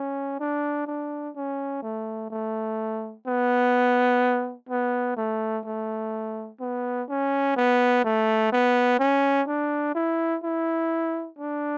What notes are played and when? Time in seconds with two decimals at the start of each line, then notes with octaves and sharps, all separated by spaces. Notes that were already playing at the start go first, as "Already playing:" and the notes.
Already playing: C#4
0.40 D4
0.87 D4
1.35 C#4
1.82 A3
2.30 A3
3.26 B3
4.69 B3
5.17 A3
5.65 A3
6.60 B3
7.09 C#4
7.56 B3
8.04 A3
8.52 B3
8.99 C#4
9.48 D4
9.95 E4
10.43 E4
11.39 D4